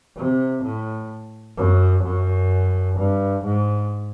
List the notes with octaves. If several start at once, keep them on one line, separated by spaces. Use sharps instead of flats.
C3
A2
F#2
F#2
G2
G#2